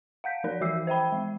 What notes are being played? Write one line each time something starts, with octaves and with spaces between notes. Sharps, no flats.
F5 F#5 G6 B6
F3 D#4 A#4 D5
E3 F#4 E5 E6 C7
C5 E5 G5 B5
G#3